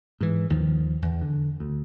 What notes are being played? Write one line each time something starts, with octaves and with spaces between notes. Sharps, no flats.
G#2 E3
D#2 D#3 F3
E2
D3
D2